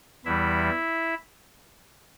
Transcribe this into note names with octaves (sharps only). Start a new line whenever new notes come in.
E2 E3 G3 E4 E5